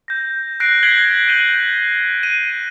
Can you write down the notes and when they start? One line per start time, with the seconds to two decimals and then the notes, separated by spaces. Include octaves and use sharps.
0.08 G6 A#6
0.60 F#6 A#6 C7 D7
0.83 G#6 B6 C7 D7 F#7 G7
1.28 G6 D#7 F#7 G7
2.23 D#7